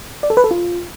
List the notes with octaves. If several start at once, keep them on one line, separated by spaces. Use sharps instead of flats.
D5
A4
B4
A4
F4